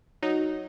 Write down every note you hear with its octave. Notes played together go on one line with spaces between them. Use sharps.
F#3 D#4